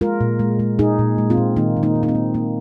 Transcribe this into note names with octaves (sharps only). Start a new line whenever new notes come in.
G#3 F4 A#4
A#2
G#3
G#3
A#2 D#4 G#4
A#2
G#3
C4 F4
A#2
D#3 A#3 D#4
D#3
A#3 D#4
D#3
D#4
C4
A#3
A#3